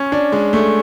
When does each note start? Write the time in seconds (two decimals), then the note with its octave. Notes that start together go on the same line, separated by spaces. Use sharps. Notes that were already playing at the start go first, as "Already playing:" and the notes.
Already playing: C#4
0.12 D4
0.32 G#3
0.53 A3